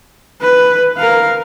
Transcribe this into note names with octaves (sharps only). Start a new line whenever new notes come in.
B4
A#4 F5